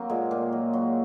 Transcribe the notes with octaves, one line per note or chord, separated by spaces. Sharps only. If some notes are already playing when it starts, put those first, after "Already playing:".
Already playing: F#3 A#3 C4
A#2 G#3
A#2
F#3
F#3